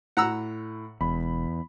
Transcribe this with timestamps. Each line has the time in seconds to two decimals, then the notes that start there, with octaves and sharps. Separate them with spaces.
0.17 A2 F#5 A#5 E6
1.01 E1 E2 B5